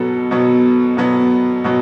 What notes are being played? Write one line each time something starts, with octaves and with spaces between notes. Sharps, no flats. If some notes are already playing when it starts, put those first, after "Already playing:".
Already playing: B2 F#3 B3 A4
B2 F#3 B3
B2 F#3 B3
B2 F#3 B3